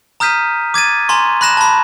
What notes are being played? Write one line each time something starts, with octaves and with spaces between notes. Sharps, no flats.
A#5 D#6 F6 G6 B6 D#7
D6 G#6 A6 D#7
G#5 A#5 C6 C#6
B5 F#6 A#6 E7
A5 B5